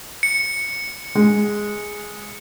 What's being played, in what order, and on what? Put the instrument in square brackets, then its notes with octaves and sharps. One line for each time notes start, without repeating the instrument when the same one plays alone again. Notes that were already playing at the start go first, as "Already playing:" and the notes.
[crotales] C#7
[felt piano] G#3